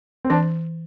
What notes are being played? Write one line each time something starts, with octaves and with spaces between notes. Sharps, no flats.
C4
E3 D4